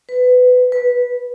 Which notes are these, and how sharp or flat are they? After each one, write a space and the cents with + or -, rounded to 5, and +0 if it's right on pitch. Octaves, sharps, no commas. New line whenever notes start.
B4 +20
B4 -10